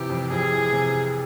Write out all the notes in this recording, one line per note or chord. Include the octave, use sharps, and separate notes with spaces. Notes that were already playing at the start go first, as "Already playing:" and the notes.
Already playing: C3 E3 G4
F2
F2 G#4
E3
C3